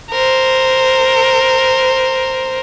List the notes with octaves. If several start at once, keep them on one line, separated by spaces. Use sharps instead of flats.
A#4 C5